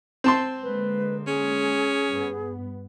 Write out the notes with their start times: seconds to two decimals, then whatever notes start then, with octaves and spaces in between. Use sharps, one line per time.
0.24 C4 A5 C6
0.63 D3 G#3 A#3 B4
1.27 C#4 G#4
2.06 G2 B3